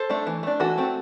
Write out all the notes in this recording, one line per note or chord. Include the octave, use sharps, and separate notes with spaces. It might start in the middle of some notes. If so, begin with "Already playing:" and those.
Already playing: A4 C5
A3 D4
E3
A3 D4
E3 F#4 A4
A3 C4